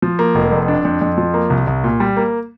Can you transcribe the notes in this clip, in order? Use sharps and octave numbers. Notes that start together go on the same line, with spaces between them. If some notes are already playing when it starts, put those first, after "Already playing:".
F3
A#3
F1
F2
D4
F2
F2
F3
A#3
C2
C2
A#2
G3
A#3